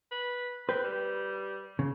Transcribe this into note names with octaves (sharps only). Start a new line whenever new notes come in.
B4
C4 B4
G3
C#3